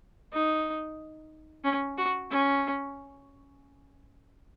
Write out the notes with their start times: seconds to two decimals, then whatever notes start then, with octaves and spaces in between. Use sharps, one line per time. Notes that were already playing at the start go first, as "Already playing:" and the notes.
0.33 D#4
1.64 C#4
1.97 F#4
2.30 C#4